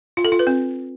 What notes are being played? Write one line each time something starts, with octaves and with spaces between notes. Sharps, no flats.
F4
A4
F4
B4
C4